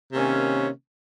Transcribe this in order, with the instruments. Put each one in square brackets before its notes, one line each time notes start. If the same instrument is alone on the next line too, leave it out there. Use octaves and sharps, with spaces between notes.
[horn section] C3 D#3 A#3 C#4